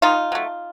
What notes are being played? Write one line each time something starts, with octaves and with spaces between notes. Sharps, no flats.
D#3 D#4 F4
F#3 A3